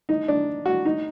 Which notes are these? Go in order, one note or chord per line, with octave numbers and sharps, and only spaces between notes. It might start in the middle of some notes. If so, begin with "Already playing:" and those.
D#4
D4
F#4
D#4